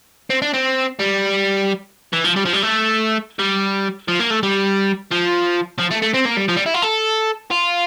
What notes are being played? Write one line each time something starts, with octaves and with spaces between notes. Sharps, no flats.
C4
D4
C4
G3
E3
F3
G3
F3
G3
A3
G3
F3
A#3
A3
G3
F3
F3
A3
A3
C4
A#3
G3
F3
G3
E4
F4
A4
F4